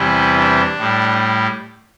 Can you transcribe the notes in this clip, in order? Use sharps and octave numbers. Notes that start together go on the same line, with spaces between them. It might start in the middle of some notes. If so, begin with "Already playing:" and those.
Already playing: E2 C3 E3 G3 E4
D4
A2 G3